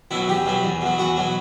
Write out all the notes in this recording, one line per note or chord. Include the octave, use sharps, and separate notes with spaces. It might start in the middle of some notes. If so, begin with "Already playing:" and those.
B2 F#3 E4
E2 G4
B2 F#3
E2
B2 F#3
E2 F#4
B2 F#3